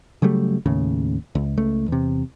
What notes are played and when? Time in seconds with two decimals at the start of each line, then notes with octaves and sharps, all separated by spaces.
0.22 C#3 F#3 G3 A3
0.66 D#2 A2 C#3
1.35 C#2
1.57 C#2 A3
1.88 E2 C3